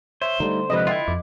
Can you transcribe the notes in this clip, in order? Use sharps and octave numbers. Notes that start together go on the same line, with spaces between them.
C5 C#5 E5
D3 G3 A3 D#4
C3 F3 G#3 B4 D#5
E4 F4 E5 G5
F2 D6